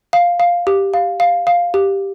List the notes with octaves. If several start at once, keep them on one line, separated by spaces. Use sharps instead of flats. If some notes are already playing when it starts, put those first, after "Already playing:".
F5
F5
G4
F5
F5
F5
G4